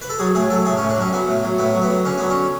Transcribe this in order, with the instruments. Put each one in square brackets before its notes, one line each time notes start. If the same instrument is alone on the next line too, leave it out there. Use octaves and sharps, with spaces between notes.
[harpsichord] B4
A4
F#3 G#4
A2 G#4
F#3 A4
A2 G#4
C#4
A2
D4
F#3 C#4
F#3 B3
A2
F#3
A2 B3
F#3
B3
F#3
D3 C#4
F#3 B3
C#4